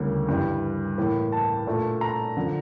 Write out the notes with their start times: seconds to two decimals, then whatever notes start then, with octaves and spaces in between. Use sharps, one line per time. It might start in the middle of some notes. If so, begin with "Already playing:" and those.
Already playing: D2 C#3 E3 G3 A#3
0.28 G2 E3 G3
0.98 A2 E3 A#3
1.32 A5
1.67 A#2 A3 D4
2.01 A#5
2.37 D3 F3